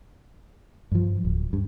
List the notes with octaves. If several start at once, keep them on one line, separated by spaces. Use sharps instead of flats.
G2 F3
D1
G2